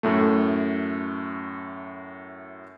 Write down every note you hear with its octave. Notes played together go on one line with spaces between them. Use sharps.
F#2 A2 A3